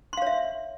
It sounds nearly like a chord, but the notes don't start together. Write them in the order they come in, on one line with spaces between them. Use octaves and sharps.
C6 F5 C#5 E5